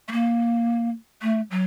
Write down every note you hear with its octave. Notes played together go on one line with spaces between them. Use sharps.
A3
A#3
A3
F#3